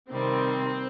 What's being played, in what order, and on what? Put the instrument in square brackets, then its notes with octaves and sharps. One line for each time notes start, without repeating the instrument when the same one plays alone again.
[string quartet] C3 D#3 G3 [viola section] C4